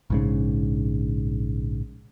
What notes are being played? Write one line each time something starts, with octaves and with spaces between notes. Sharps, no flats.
A#1 G#2 C#3